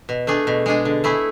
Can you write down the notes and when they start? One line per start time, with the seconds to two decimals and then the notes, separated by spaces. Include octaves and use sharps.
0.09 B2
0.27 A3 D4 G#4
0.47 B2
0.66 G#3 D4 G#4
0.85 D3
1.04 A3 E4 G#4